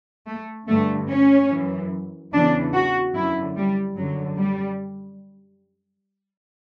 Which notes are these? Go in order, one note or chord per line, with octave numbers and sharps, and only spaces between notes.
A3
G2 D3 A3
C#4
F#2 E3
E2 C#3 E3 D4
F#4
F#2 D3 E4
G3
F#2 D3 F#3
G3